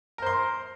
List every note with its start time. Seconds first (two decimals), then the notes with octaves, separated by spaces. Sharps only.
0.18 A#4
0.22 C5
0.26 C6